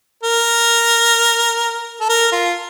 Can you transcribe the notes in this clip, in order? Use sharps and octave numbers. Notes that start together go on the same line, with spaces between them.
A#4
A4
A#4
F4